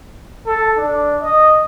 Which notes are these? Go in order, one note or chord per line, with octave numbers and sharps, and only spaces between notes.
A4
D4
D#5